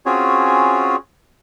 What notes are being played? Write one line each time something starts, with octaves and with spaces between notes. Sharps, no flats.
C4 C#4 F4 F#4 G#4 C#5